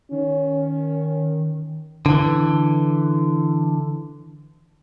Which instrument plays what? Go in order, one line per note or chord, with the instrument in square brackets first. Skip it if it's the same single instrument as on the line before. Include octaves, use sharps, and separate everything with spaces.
[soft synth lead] D#3 [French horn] C#4
[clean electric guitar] D3 E3